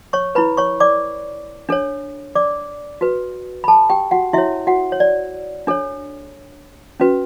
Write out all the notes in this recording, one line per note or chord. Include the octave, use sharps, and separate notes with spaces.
C#5 C#6
E4 B4 B5
C#5 C#6
D5 D6
D4 A4 C#5
D5 D6
F#4 B4
B5
A4 A5
G4 G5
F#4 F#5
E4 F#4 C#5 E5
F#4 F#5
C#5
D5
D4 A4 C#5
C#4 F#4 B4